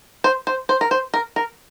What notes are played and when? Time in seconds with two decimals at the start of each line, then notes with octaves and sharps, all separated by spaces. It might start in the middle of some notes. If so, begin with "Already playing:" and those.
0.24 C5
0.47 C5
0.69 C5
0.81 A#4
0.91 C5
1.14 A#4
1.36 A#4